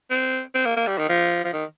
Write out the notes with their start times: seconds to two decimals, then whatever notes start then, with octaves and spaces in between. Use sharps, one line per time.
0.10 C4
0.55 C4
0.65 A#3
0.76 A#3
0.87 G3
0.98 D#3
1.09 F3
1.44 F3
1.53 D#3